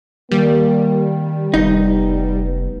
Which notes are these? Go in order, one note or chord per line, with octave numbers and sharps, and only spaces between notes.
D#3 G3 A#3
F1 B3 D#4